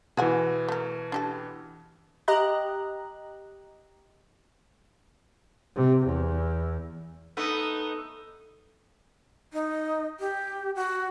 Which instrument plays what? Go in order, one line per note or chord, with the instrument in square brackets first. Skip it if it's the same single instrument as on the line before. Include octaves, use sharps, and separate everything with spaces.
[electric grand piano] B2 E3 [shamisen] G#4 F#5 G#5
[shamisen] A3 A#4
D4 G4 A4
[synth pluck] G4 D#5 A#5 F#6
[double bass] C3
E2
[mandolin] A3 [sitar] B3 D#4
[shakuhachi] D#4
G4
F#4